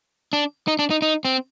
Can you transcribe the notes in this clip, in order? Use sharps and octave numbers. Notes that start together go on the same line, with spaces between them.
D4
D#4
D4
D#4
D#4
C4